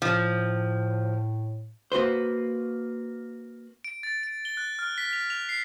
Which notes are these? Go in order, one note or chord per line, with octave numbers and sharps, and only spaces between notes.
A2 F3
A#3 F#4 B4 C5
D7
A6
D7
G7
F#6
F6
B6
F7
F7
C7